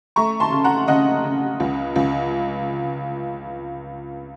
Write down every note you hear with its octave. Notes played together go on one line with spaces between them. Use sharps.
A3 A#5 C#6
A5 C6
C#3
F#5 A#5
C#3 D#5 F#5
C#3
C#2
C#2